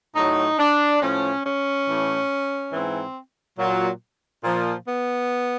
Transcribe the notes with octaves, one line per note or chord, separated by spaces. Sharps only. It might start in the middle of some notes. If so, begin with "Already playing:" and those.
A2 F#3 D#4
D4
A2 F3 C#4
C#4
A2 E3
G#2 E3 C4
A#2 F#3
A#2 F3
B3